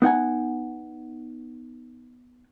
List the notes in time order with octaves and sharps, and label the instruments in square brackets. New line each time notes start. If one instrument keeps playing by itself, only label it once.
[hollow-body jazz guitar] B3 D#4 F#5 G#5